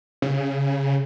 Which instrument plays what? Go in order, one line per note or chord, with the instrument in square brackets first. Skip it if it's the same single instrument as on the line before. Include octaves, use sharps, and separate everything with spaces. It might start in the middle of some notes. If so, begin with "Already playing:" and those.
[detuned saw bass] C#3